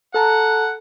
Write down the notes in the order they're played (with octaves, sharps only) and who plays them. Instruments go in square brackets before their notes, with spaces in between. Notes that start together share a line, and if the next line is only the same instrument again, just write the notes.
[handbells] A4 A5 A#5 [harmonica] F#5